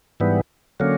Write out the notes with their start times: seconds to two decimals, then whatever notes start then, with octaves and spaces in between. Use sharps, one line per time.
0.20 G#2 E3 G3 B3
0.80 D3 F#3 A#3 C#4